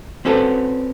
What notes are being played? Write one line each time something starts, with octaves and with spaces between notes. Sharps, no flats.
C4 C#4 F#4 A4 B4